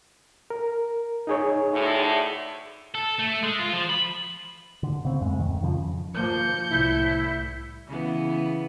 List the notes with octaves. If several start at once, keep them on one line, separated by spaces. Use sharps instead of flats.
A#4
D#4 G#4 C#5
D2 A2
A4
A3
G#3
F4
F3
B5
D3
C#3 C4
F2 A2 G#3
D1 D#3
F2 C#3 F3
F3 A#3 G6 C#7
C2 A2 E4
C#3 E3 B3